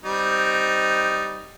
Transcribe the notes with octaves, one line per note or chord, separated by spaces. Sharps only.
G3 C4 D#4